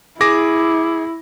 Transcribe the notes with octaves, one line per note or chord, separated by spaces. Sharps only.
E4 G#4 D6 A#6